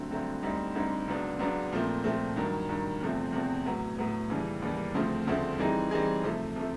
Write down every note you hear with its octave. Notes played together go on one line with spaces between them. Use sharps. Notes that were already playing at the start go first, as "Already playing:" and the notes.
Already playing: G2 D3 F#3 A3 C4
G2 D3 F#3 A3 C4
D2 D3 G3 C4 D#4
D2 D3 G3 C4 D#4
C#2 C#3 F#3 B3 D4
C#2 C#3 F#3 B3 D4
A#2 F3 A3 C4
A#2 F3 A3 C4
G2 D#3 F#3
G2 D#3 F#3
E2 C3 F3 A3 C4
E2 C3 F3 A3 C4
A2 F#3 B3
A2 F#3 B3
D#2 C#3 E3 G3
D#2 C#3 E3 G3
D2 C#3 F3 A3 C4
D2 C#3 F3 A3 C4
E3 G3 C4 D#4 G#4
E3 G3 C4 D#4 G#4
C3 F3 A3
C3 F3 A3